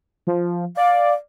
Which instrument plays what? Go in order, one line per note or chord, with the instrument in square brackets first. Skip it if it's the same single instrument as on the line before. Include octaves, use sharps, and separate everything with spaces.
[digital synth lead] F3
[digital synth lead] D5 [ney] F5